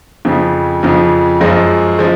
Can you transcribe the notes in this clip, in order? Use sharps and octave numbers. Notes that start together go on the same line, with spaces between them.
F2 C#3 F3
F2 C#3 F3
F#2 F3 G#3
F3 G#3